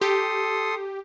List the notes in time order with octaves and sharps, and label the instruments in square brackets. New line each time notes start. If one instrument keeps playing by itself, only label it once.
[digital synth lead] G4 [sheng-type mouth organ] A4 C6 D#6